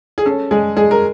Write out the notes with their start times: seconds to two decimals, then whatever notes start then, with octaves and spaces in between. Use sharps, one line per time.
0.18 G#4
0.25 C#4 A4
0.51 G#3 G#4
0.77 G#3 G#4
0.91 A#4